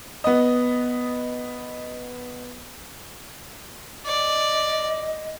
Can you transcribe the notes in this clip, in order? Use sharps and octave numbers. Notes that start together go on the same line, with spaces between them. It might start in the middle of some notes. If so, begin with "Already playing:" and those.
B3 D#5
D5 D#5